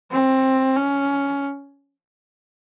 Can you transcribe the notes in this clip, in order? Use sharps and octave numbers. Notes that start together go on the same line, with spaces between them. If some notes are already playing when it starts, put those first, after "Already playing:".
C4
C#4